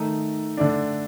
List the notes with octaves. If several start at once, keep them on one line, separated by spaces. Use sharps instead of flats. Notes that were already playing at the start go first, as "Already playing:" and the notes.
Already playing: D#3 A3 D#4
D3 A3 D4